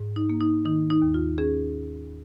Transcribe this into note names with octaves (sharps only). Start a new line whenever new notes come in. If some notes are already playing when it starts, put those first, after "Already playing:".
Already playing: G#2
D#4
A#3
D#4
D#3 D#4
D#4
D#2
F4
C#4 G#4